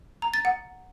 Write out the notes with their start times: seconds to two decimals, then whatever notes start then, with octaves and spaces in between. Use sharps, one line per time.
0.22 A#5
0.34 A6
0.45 F#5